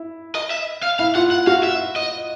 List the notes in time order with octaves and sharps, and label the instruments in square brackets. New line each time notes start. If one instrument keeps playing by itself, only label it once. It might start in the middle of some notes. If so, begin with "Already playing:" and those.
Already playing: [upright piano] E4
[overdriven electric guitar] D#5
E5
F5
[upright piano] E4 [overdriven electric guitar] F5
[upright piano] F4 [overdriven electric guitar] F#5
[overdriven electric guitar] F#5
[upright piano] F#4 [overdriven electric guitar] F5
[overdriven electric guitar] E5
D#5